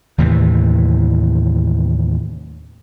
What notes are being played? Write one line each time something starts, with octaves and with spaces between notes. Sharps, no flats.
D#2 A2 C3 E3